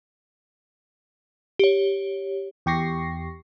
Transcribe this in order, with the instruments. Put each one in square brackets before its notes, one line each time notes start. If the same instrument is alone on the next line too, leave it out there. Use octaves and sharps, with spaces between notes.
[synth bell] G4 C#5
[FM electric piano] E2 G4 C#6 A#6 C7